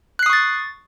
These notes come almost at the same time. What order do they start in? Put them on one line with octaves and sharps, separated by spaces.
F#6 C7 D#6 C#6 A6